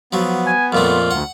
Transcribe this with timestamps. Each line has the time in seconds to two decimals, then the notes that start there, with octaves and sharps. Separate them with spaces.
0.13 F3 F#3 B3
0.47 G#5
0.72 F2 A#2 A3 F4
1.11 D2 F#5